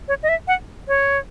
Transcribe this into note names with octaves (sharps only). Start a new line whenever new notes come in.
C#5
D#5
E5
F#5
C#5